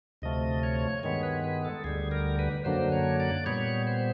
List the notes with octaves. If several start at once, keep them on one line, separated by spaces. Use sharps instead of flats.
D2 C3 F3 A3 D#5
C#5
G2 D#3 G#3 B3 C#5
B4
B4
A4
D2 D3 G3 G#4
A#4
B4
F#2 D3 F#3 A#3 D4 C5
C#5
D5
A#2 G3 B3 C#5
C5